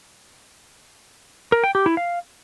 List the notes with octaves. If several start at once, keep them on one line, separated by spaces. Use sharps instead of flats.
A#4
G5
G4
E4
F5